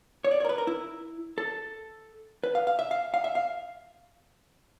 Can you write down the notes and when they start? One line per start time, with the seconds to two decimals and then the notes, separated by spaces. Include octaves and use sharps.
0.24 C#5
0.31 D5
0.40 C#5
0.45 A#4
0.49 B4
0.58 A#4
0.67 E4
1.38 A4
2.44 B4
2.55 F5
2.67 F5
2.79 E5
2.91 F5
3.14 F5
3.24 E5
3.35 F5